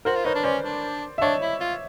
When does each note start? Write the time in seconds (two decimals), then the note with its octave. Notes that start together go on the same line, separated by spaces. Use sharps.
0.05 F#4 A#4 C5
0.15 F4
0.25 D#4 B4 C#5
0.35 D4
0.44 C#4 C5 D5
0.64 D4
1.18 E5
1.21 D4 C#5 D#5
1.42 E4
1.60 F4